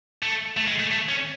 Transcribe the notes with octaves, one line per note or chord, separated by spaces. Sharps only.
A3
A3
G#3
A3
A3
C#4